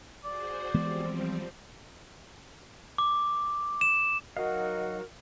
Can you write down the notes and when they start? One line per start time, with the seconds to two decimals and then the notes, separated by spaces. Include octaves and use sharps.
0.24 F#4 G#4 C5 D5
0.74 E3 F3 G3 G#3 B3 C4
2.98 D6
3.81 E7
4.37 F#3 D#4 F#4 A#4 D#5 F5 F#5